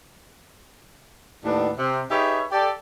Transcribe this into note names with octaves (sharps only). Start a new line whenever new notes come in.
D#2 A2 B3 D4
C3
D#4 G4 G#4 B4 C#5 E5
G4 A4 D5